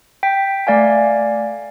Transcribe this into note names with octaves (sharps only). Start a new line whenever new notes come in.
G5 B6
A3 D5 F5 G#5